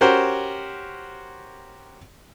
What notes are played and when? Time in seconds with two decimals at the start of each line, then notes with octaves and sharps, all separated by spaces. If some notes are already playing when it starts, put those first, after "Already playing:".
0.01 C#4 F#4 G4 A#4 C5